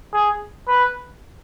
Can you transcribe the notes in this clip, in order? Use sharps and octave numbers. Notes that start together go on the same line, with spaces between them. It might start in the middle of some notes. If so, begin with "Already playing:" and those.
G#4
B4